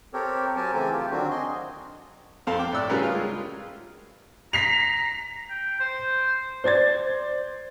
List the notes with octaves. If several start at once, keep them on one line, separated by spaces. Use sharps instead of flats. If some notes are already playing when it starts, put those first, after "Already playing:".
C4 G4 A4 A#4 C#5
F#3 C4 G4 A#4 G#5 A5
C#3 E3 A3 C4 A4 G#5
F4 G4
D3 D#3 F#3 C4 D4 F#4
D#5 G#5 C6
F2 C4 A4 F5 C6
G5 D6
A2 D5 E6 F#6
C#3 G3 F#4 G#4 A#4 B4
F4 F6
G#3
A#5 B6 C7 F7
G5
C5
C5 D5 G#6 A6